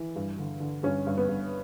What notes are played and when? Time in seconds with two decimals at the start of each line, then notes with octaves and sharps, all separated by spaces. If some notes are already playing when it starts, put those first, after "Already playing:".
Already playing: E3
0.16 G2
0.38 D3
0.60 D3
0.83 G2 C#4
1.07 G2
1.18 B3
1.29 G2